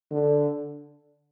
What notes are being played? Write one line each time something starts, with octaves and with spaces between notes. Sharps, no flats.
D3